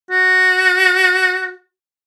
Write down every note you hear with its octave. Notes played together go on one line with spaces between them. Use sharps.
F#4